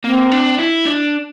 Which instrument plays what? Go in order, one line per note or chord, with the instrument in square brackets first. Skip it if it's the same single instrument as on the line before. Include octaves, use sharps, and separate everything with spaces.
[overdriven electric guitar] A#3 [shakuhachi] C4
[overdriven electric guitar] D4
E4
D4